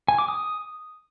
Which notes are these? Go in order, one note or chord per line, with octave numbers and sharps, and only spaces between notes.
G#5
D6
D#6